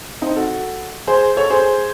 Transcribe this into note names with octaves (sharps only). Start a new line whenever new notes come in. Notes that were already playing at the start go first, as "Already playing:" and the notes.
C4 D#4
F#4 A4
G#4 C5
A4 C#5
G#4 C5